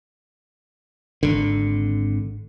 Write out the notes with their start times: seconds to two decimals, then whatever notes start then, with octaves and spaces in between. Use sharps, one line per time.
1.23 G#1 D3